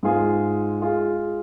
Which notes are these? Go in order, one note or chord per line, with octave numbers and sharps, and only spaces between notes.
G#2 G#3 F4 G#4
G#3 F4 G#4